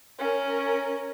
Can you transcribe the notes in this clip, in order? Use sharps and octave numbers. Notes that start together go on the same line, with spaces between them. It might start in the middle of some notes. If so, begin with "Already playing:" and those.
C#4 A#4